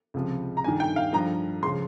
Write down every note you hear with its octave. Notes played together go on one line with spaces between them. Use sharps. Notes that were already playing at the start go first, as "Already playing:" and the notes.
C#2 C3 F3
A#5
G2 D#3 G#5
G5
F5
G2 F3 A#5
C#2 C#3 F3 C6